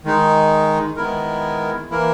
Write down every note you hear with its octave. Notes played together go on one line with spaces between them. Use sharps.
D#3 G#3 D#4
D#3 G#3 B3 E4 A#4
E3 A#3 E4 A#4